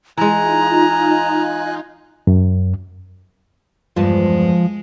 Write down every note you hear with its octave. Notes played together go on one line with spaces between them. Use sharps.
E3 G#3 D#4 F4 G#5 A#5 F#6
F#2
E2 G2 F3 G#3 A5